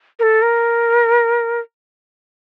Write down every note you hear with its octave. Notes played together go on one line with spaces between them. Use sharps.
A#4
A4
A#4